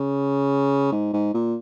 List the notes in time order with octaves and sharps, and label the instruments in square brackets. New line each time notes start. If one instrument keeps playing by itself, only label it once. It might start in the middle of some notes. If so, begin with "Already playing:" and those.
Already playing: [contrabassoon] C#3
G#2
G#2
A#2